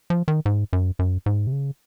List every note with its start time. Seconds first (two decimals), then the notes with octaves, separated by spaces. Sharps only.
0.10 F3
0.28 D#3
0.46 G#2
0.73 F#2
0.99 F#2
1.26 G#2
1.47 C3
1.52 C#3